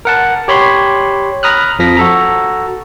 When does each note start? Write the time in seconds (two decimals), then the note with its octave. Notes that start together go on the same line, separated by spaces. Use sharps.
0.05 A#4 F#5 A5
0.48 G4 C#5 B5 C6
1.43 A#5 B5 D#6 F6 F#6
1.79 F2 F3 A#6 B6
1.97 F#4 A4 A#5